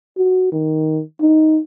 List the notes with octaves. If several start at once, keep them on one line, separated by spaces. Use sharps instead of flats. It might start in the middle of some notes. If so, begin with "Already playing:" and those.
F#4
D#3
D#4